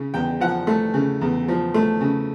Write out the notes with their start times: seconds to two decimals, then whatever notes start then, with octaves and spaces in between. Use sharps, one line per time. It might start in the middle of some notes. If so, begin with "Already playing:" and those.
Already playing: C#3
0.14 E2 G5
0.40 F3 F#5
0.67 A3
0.94 C#3
1.21 E2
1.48 F3
1.74 A3
2.01 C#3